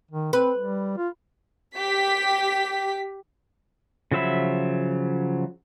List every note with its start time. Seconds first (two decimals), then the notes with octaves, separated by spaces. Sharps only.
0.11 D#3
0.33 C4 B4
0.58 G3
0.97 F4
1.76 G4 B6
4.11 C#3 F3 F#3 E5 B5